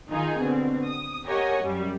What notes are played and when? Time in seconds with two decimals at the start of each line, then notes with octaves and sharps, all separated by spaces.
0.11 D#3 D#4 F4 G#4 G#5
0.41 B2 D3 C4
0.86 D#6
1.26 G4 A#4 C#5 D#5 F#5 G#5
1.63 F#2 G3